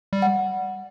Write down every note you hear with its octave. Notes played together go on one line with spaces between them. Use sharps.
G3
F#5